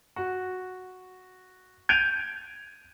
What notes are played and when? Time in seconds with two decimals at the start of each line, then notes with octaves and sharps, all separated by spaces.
0.16 F#4
1.89 G6 G#6 D7 D#7 F7